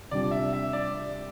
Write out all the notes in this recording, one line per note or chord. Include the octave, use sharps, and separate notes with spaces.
C3 G3 D4 F4 D5
E5
E5
D5